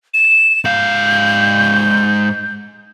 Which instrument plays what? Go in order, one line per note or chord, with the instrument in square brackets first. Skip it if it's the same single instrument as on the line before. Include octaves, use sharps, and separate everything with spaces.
[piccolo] E7
[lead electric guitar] G#2 F5 [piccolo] G6